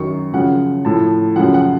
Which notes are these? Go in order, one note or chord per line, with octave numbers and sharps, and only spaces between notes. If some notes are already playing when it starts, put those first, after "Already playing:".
Already playing: F#2 D#3 C#6
F#2 C#3 F3 F#5
A2 F3 A5
F#2 C#3 F3 F#5
F#5